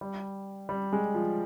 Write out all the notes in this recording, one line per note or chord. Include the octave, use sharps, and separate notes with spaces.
G3
G3
G#3
F3